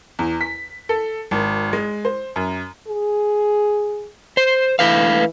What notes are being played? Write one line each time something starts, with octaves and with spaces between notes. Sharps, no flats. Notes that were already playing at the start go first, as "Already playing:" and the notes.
E2
B6
A4
G#1
G#3
C5
F#2
G#4
C5
E3 A3 B4 F5